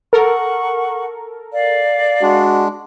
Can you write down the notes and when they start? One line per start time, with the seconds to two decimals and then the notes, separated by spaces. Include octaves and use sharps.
0.13 A4 A#4 F#5 C#6
1.52 D5 F5
2.22 G#3 D4 F#4